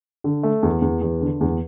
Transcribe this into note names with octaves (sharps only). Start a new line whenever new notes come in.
D3
A3
E2
E2
E2
D3
E2